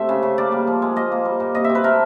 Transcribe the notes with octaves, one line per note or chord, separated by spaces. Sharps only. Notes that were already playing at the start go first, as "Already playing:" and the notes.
Already playing: C3 A3 E5
C#3
C#3
A#3 D5
G3
F3
G#3
A#3 D#5
A#3
G3
A#2
C3 D#5
E5
C3
B4
A3 A#4